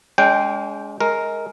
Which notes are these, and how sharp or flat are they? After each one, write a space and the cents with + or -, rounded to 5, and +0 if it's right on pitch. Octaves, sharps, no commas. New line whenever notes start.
G#3 +0 C#4 +45 G5 +0
G#3 +20 A#4 +0